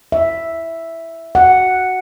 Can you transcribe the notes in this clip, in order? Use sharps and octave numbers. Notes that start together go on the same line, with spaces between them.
E5
F#5